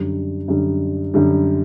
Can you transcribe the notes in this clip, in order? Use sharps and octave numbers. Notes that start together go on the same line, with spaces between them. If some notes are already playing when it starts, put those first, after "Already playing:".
Already playing: F#2 D3 G3
F#2 D3 G3
F#2 D3 G3